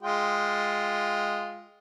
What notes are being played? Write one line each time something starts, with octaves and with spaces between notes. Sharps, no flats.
G#3 F4 G5